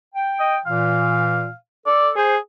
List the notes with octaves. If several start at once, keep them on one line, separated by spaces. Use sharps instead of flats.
G5
D#5
A#2 E3 F5
A4 D5
G#4 C5